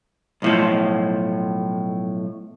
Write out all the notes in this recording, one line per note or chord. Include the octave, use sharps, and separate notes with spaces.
B1 A2 F3